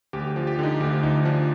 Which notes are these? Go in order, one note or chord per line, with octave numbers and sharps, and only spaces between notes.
D2 G4
G4
F3
G4
D3 D#4
D2 G4
D2 D#4
F3 D4